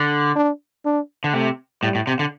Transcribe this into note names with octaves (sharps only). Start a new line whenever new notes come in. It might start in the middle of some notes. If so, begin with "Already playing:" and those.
Already playing: D3
D4
D4
D3
C3 A3
A2 G3
A2
C3
D3